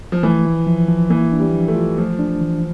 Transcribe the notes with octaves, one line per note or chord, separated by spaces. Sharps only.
F3
E3 A3
E4
F3
F3
E3 A#3
D4
G3
F3
A3
F4
F3 A3
D4
E3